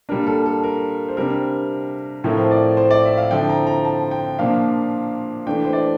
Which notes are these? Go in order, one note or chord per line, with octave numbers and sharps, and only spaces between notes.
A#2 G3 D4 A#4
A4
A4
A#4
C5
C3 G3 D4 A#4
A2 F3 A3 C4 E4 A#4
C5
D5
C5
D5
E5
F5
D3 F3 C4 E4 G5
A#5
A#5
A5
G5
A#2 F3 A#3 D4 F5
E3 A3 D4 G5
C5
D5